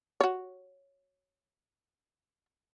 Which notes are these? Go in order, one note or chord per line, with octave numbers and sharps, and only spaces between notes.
F#4 C#5